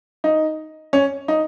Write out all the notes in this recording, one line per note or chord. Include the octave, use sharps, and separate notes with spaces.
D#4
C#4
D#4